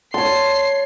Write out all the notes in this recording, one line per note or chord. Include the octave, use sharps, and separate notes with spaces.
C#5 A5 C6 C7